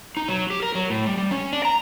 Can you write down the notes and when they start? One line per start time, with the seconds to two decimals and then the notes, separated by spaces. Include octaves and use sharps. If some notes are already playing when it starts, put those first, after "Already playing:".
0.17 D#4
0.28 F#3
0.50 G4
0.63 A#4
0.75 F#3
0.90 A2
1.06 G3
1.17 G3
1.31 C#4
1.53 D4
1.65 A#5